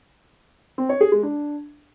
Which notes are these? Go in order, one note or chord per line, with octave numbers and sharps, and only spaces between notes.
C4
C#5
G#4
G#3
D4